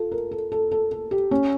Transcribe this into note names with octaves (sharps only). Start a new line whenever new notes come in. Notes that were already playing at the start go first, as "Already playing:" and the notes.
Already playing: F4 A4
A#4
A4
A4
A4
A4
G4
C#4